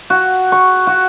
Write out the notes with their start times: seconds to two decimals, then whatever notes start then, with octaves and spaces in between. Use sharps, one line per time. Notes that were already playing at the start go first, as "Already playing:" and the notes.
0.10 F#4
0.52 C#6
0.87 F#4